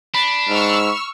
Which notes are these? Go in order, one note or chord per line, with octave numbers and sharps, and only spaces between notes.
D4 B5 B6
G#2 C#6 E6 F6